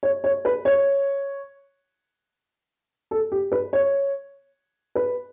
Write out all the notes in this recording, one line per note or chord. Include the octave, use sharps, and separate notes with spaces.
C#5
C#5
B4
C#5
A4
G4
B4
C#5
B4